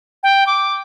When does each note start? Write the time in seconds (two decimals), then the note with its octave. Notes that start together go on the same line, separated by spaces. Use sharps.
0.23 G5
0.47 D6